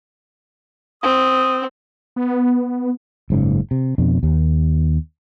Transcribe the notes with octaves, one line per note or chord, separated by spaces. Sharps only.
C4 D#6
B3
F#1 G#2 C#3
C3
F2 B2 D4
D#2